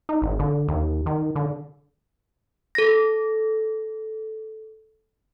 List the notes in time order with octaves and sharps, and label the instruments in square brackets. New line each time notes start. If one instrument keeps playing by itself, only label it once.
[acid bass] D#4
G#1
D3
D#2
D#3
D3
[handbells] A4 A#6